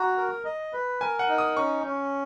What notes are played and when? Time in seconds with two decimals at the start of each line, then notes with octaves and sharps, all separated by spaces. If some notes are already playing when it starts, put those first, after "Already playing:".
Already playing: F#4 A#5
0.17 A#4
0.45 D#5
0.73 B4
1.01 A#4 G#5
1.19 F#5
1.28 D#4
1.38 D#6
1.57 C#4 C#6
1.85 C#4